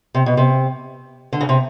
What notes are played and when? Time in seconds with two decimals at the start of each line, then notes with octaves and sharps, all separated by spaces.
0.14 C3
0.26 B2
0.37 C3
1.32 D3
1.41 C#3
1.49 C3